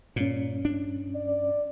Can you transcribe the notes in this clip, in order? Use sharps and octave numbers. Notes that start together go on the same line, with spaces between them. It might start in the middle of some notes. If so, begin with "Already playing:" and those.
G2 A#2 C#4
D4
D5